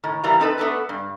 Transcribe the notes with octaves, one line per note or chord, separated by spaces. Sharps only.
A2 D#3
E3 G3 A#3 A#5
C4 D#4 A4 B4
A3 B3 D4 A4 B4
G2